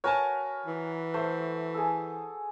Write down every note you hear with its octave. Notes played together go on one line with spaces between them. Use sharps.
F#4 A#4 B4 C#5 G#5 A5
E3
A3 C5
G#4 A4